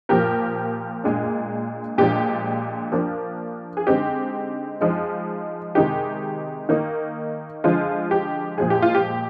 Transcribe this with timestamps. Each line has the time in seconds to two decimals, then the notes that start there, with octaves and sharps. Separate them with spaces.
0.09 A#2 F3 A#3 G4 A#4
1.04 A#2 G#3 D4
1.98 A#2 F3 G#3 D4 G4
2.92 F3 A#3 D4
3.77 G#4
3.87 D3 G#3 C4 D#4 G4
4.81 F3 G#3 D#4
5.75 C3 D#3 G#3 D#4 G4
6.69 D#3 A#3 D#4
7.64 D3 F3 G#3 F4
8.11 G4
8.58 A#2 F3 G#3 G#4
8.70 G4
8.82 F4
8.95 G4